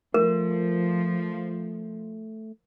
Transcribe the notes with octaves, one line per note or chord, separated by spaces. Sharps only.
F3 A3 A#4